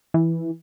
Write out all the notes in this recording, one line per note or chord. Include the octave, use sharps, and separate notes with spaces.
E3